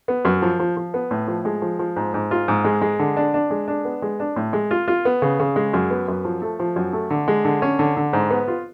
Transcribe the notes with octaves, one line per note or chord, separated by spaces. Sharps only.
B3
F#2
F3
F3
F3
B3
A2
F3
G#3
F3
F3
G#2
G#2
F4
G#2
G#3
G#3
D3
D4
D4
G#3
D4
B3
G#3
D4
A2
G#3
F4
F4
B3
C#3
C#3
G#3
F#2
B3
F#2
F3
A3
F3
F#2
A3
D3
G#3
D3
C#4
D3
D3
G#2
B3
F4